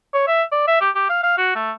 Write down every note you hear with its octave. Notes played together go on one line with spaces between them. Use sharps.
C#5
E5
D5
E5
G4
G4
F5
F5
F#4
A3